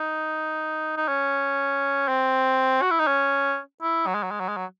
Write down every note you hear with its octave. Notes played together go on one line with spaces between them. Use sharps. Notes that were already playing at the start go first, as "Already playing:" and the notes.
Already playing: D#4
D#4
C#4
C4
F#4
E4
D#4
C#4
E4
F#3
G#3
F#3
G#3
F#3
G#3
F#3